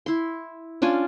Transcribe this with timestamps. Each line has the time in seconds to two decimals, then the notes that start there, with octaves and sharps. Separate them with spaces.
0.06 E4 C6
0.82 C#4 D4 F4 G#5